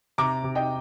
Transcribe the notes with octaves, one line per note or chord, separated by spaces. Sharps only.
C3 A#5 D6
C3
D#5 G5